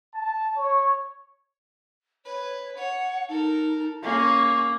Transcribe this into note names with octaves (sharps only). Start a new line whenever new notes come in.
A5
C#5
B4 C#5
C#5 F#5
D#4 A4 A#4
A#3 C#4 G#4 C#6